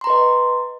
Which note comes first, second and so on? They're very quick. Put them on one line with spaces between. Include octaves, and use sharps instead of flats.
C6 A#5 B4 D#5